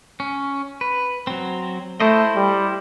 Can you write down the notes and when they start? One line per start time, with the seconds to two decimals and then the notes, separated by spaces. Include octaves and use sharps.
0.20 C#4
0.81 B4
1.27 F#3 C4
2.00 A3 E4 C5 D#5
2.35 G3